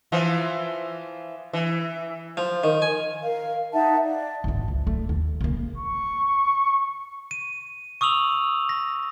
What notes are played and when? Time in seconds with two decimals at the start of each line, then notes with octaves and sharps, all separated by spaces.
0.12 E3 F3 F4
1.53 E3
2.37 F3
2.64 D#3
2.82 G#5
3.23 A#4 F5
3.72 D#4 E5 F#5 A5
4.04 D5
4.44 G#1 G#2
4.68 C#2
4.87 A3
5.09 D#2
5.41 C#3 A#3
5.77 C#6
7.31 D#7
8.01 C#6 D#6 E6 F7 F#7
8.69 A#6